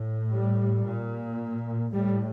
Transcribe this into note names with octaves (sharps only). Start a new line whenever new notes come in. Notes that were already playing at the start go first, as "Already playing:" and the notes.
Already playing: A2
G3
A#2
A2 G3